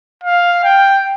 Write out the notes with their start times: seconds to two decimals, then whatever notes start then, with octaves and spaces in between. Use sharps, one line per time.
0.23 F5
0.64 G5